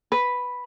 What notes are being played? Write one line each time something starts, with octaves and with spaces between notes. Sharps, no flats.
B4